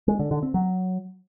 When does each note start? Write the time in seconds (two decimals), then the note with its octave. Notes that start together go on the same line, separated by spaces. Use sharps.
0.08 G#3
0.19 D3
0.31 D3
0.43 C4
0.54 F#3